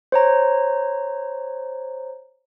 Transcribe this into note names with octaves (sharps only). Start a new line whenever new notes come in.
C5 C#5 A#5